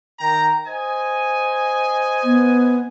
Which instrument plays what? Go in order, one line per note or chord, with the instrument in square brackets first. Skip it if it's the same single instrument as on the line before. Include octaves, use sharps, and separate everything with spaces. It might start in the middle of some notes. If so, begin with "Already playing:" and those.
[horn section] D#3 G5 A#5
C5 D#5 G#5
[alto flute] B3